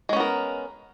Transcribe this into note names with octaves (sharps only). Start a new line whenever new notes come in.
G#3 B3 C#4 A#4